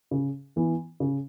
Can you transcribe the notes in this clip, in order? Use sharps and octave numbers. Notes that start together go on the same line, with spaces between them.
C#3
E3 B3
C#3